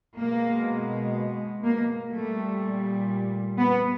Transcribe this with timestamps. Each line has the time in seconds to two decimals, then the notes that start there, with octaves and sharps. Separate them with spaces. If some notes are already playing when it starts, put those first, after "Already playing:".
0.18 B2 G#3 A#3
1.64 A#3
2.12 A#2 G3 A3
3.58 B3